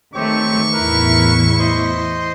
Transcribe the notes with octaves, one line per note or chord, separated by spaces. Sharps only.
D#3 A3 C4 G4 C#5 C#6
E2 A2 E4 A#4 B4
C5 D#5 C6